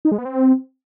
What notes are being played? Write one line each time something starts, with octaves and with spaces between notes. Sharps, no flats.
D#4
G#3
B3
C4